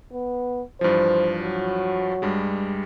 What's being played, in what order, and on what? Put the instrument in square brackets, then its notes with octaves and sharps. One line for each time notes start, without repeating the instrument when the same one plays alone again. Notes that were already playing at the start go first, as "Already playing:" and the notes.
[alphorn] B3
[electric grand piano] G2 E3 F3 [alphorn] C5
[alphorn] F#3
[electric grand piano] G2 G3 G#3